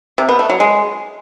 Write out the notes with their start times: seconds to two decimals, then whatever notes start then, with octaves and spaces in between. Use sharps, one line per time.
0.18 C3
0.29 B3
0.39 A3
0.50 F#3
0.60 G#3